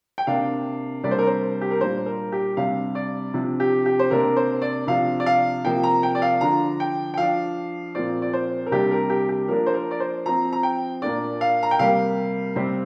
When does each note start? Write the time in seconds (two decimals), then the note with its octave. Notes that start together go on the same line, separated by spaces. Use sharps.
0.18 G5
0.27 C3 A#3 D4 F5
1.04 C3 G3 A#3 D4 D5
1.11 C5
1.19 A#4
1.27 C5
1.61 G4
1.71 A#4
1.80 A#2 G3 A#3 D4 C5
2.06 A#4
2.32 G4
2.57 C3 G3 D4 F5
2.95 D5
3.34 C3 F3 D4
3.60 G4
3.86 G4
3.99 C5
4.11 C3 A#3 D4 A#4
4.37 C5
4.62 D5
4.87 C3 F3 D4 F5
5.20 D5
5.26 F5
5.65 C3 F3 A#3 G5
5.83 A#5
6.03 G5
6.15 D5
6.22 F5
6.41 D3 F3 D4 A#5
6.80 G5
7.14 G5
7.17 F3 D4 F5
7.95 A#2 F3 C4 D5
8.22 D5
8.33 C5
8.66 A#4
8.72 C3 G3 A#3 D4 G4
8.91 A#4
9.10 G4
9.29 G4
9.48 F3 A#3 D4 A#4
9.66 C5
9.74 A#4
9.91 D5
10.00 C5
10.26 F3 C4 A#5
10.53 A#5
10.63 G5
11.02 A#2 A#3 D4 D5
11.41 F5
11.63 A#5
11.71 G5
11.79 C3 G3 A#3 F5
12.56 C3 G3 C4